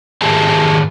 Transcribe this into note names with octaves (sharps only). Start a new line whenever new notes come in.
D#3 G4 G#4 E5 G#5 A5